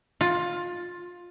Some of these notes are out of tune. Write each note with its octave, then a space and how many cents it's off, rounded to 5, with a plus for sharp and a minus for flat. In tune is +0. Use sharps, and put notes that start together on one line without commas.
F4 +15